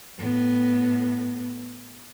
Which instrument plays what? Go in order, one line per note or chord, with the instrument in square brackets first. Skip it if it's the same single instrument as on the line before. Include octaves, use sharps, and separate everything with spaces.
[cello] A2 B3